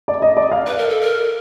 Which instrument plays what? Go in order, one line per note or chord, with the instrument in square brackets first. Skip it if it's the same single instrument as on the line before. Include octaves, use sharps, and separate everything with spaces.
[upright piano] D5
D#5
D5
F5
[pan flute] B4
A#4
A4
A#4